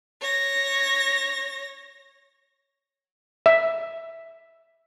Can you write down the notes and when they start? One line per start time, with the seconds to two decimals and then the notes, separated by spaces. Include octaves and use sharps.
0.21 C#5 A#6
3.46 E5